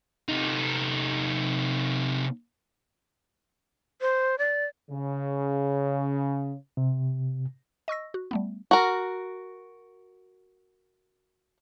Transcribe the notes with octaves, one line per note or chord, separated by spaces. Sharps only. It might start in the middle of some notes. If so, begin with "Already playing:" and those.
C3 D#4
C5
D5
C#3
C3
D#5 C#6 E6 A#6
F#4
G3 A3 B3
F#4 A#4